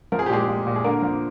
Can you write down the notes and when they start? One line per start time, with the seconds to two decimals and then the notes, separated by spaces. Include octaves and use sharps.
0.12 F3 A#4
0.19 G#4
0.26 G4
0.30 A#2 G#3 G#4
0.48 F3
0.67 A#2
0.76 G#4
0.84 D3 A#3 A#4
1.02 F3